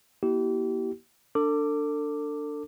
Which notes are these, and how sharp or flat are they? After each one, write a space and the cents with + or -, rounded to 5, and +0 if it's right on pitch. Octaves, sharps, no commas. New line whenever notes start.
A#3 +40 E4 -20 G4 -35
D4 +0 A4 +35 D6 +0